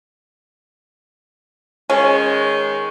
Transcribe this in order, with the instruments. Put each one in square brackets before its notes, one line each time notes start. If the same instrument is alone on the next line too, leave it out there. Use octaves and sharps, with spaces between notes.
[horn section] D#3 G#3 [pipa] C#4